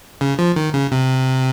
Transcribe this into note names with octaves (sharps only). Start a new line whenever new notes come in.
C#3
F3
D#3
C#3
C3